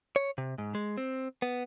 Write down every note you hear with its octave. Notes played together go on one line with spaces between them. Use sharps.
C#5
C3
G#2
G#3
C4
B3